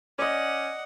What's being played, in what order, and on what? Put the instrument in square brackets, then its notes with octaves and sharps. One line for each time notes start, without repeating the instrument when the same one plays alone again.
[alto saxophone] C#4 [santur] D5 D#5 [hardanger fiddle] F#5